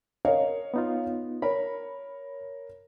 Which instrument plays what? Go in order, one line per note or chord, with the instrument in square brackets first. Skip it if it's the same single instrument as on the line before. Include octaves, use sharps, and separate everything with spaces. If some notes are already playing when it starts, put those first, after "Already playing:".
[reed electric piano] A#4 [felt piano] C#5 D#5 F5
[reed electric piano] B3 D#4 F4
[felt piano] A#4 C#5 [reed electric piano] B5